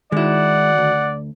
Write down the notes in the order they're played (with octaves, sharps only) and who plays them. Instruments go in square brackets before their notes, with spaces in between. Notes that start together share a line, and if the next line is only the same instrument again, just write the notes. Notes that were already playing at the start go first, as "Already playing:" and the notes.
[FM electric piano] D#3 F#4 [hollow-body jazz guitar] G#3 E4 [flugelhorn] D5 [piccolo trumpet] F#5
[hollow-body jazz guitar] D2